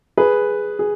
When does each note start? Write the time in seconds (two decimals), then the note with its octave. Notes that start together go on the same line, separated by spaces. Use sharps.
0.17 G#4 B4
0.79 G#4